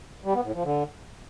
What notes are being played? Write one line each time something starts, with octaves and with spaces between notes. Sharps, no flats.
G3
B3
A2
F3
D3